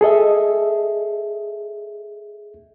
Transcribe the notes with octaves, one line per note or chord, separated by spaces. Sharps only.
G#4 A4 D#5 E5